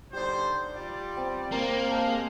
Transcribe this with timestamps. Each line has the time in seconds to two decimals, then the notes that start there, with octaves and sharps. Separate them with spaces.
0.13 D3 G3 D#4 G4 C5
0.73 G3 F4 D5
1.17 C4
1.52 A#3 C4 A#5
1.91 G#3 D#4 A5